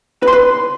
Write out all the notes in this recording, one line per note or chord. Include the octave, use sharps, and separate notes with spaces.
B4
C6
B4